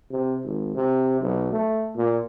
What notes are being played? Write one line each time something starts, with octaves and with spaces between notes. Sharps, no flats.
C3
G#1
C3
B1
A3
A#2